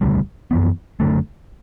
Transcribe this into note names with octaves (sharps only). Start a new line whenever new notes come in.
E1 D2 C#3 G3
F#2 E3 B3
F#1 F#2 D3 A3